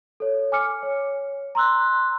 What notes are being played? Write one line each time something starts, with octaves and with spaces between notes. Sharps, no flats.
A4 C#5
G#5 D6 F6 C#7
C#5
A#5 C6 E6 F#6